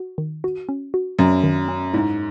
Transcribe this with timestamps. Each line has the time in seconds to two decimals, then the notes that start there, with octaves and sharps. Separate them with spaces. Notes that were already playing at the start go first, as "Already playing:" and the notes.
Already playing: F#4
0.18 D#3
0.44 F#4
0.69 C#4
0.94 F#4
1.19 F#2 F#3
1.44 D#3
1.68 C#4
1.94 G#2 E4